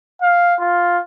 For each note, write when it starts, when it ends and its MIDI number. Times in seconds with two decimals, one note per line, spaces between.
0.22 0.55 77
0.60 0.99 65